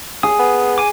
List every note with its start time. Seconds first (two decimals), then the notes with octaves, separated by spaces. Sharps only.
0.23 G#4 D#6
0.39 B3
0.78 G#5 D6